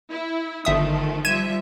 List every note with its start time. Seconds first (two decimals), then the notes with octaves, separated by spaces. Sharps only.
0.10 E4
0.65 G1 D#3 F3 A3 E5 D#6
1.25 F3 G3 E5 G#6 D#7 E7